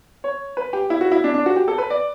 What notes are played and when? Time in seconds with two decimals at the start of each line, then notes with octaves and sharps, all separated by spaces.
0.24 C#5
0.57 B4
0.73 G4
0.90 E4
1.01 F#4
1.12 E4
1.24 D4
1.34 D4
1.46 F#4
1.56 G4
1.68 A4
1.78 B4
1.90 D5